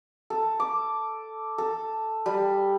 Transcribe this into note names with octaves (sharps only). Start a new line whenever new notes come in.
A4
D6
A4
G3